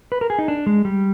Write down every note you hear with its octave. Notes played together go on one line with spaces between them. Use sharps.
B4
A#4
G#4
D#4
D4
G#3
G3